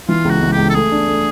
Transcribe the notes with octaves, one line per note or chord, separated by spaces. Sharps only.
E3 F4
C#2
F#4
C#2
G4
C#2
A4
A3 G#4
D4
A3